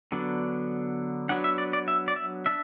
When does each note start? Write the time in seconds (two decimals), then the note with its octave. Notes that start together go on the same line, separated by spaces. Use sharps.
0.12 D3 F#3 B3 D4
1.29 F#3 B3 D4 F#5
1.44 E5
1.58 D5
1.73 D5
1.88 E5
2.08 D5
2.16 E5
2.46 D4 E5